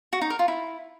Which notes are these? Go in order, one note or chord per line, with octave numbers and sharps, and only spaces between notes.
F#4
D#4
A#4
F4
E4